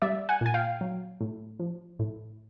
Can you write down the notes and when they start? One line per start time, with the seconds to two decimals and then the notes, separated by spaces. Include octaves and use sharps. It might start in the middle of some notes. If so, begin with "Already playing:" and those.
0.02 G3 D5 E5
0.29 F#5 G#5
0.41 A#2 G#5
0.54 F5 G5
0.81 F#3
1.21 A2
1.59 F3
1.99 A2